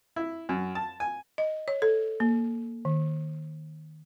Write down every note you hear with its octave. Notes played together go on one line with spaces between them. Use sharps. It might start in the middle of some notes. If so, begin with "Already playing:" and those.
E4
F#2
A5
G#5
D#5
C#5
A4
A#3
D#3